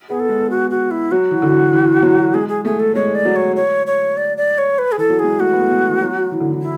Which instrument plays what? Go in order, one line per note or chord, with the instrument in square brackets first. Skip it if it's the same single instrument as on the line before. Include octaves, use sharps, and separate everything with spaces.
[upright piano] B3 [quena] G#4
[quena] A4
[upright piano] G#3
[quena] F#4
F#4
E4
[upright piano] F#3 [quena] F#4
[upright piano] E3
D3
E3
F#3
[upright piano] G#3 [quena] G#4
[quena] G#4
[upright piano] A3 [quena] G#4
[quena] A4
[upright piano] G#3 [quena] C#5
[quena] D5
[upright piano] F#3
[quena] C#5
C#5
C#5
D5
D5
C#5
B4
G#4
[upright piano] E3 [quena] A4
[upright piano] F#3
[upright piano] G#3 [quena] G#4
[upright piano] A3 [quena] F#4
[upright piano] B3
A3
G#3
E3
F#3
E3
D3
E3
[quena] E4